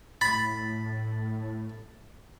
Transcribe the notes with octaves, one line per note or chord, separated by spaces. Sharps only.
A2 B5 A6